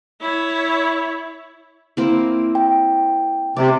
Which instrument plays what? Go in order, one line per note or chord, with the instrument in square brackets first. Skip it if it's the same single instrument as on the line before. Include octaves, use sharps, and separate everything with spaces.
[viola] E4 C#5
[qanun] A#3 C4 E4
[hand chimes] G5
[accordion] C3 [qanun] C4 D5